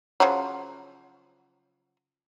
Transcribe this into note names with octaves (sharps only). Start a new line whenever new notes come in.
C#3 F3 F#3